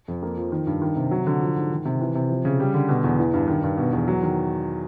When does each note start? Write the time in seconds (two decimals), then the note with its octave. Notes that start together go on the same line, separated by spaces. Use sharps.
0.08 F2
0.23 A#3
0.37 F3
0.52 D#3
0.67 G2
0.82 D#3
0.96 C3
1.11 F#3
1.27 D3
1.41 F3
1.56 G#2
1.71 D#3
1.85 C3
2.01 E3
2.15 C3
2.30 F3
2.45 C#3
2.60 G3
2.74 D3
2.89 B2
3.04 E2
3.19 E3
3.34 G2
3.48 D#3
3.64 G2
3.77 B2
3.93 E2
4.08 F#3
4.23 D#3